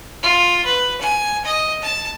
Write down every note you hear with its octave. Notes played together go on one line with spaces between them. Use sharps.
F4
B4
G#5
D#5
A5